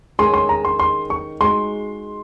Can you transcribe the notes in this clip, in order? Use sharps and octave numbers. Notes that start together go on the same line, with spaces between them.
D#3 G#3 C#4 G#4 C6
C6
A#5
C6
C6
C#6
G#3 D#4 F#4 C6